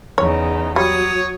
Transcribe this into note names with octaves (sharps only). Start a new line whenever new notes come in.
E2 C#3 D#4 C#5
F#3 G3 C#5 D#6